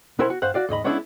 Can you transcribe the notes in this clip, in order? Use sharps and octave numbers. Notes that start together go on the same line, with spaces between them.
B1 B3 E4 A#4 C5 G#5
F#4
G2 C5 F5 F#5
F#4 D5 F5
D#2 G#2 D#5 B5
G#3 B3 C#4 D4 E4 G#4